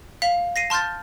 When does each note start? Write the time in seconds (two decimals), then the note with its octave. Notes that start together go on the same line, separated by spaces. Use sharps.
0.22 F5 B6 F7
0.56 A#6 C7 D#7
0.70 A5 C6 F6 G6 A6